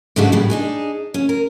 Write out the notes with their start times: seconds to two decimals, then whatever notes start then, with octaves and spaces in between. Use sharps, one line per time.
0.16 G#2 C#3 G#3 A3 D4 F#4
0.32 A2 G3
0.50 D4 D#4 G#4
1.14 C#4
1.29 A#4